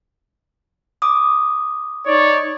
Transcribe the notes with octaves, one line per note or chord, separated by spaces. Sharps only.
D6 D#6
D#4 C#5 D5